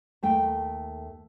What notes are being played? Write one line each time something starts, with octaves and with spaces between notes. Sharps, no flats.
D#2 A3 G5